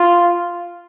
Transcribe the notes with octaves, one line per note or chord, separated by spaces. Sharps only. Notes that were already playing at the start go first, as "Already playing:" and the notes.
Already playing: F4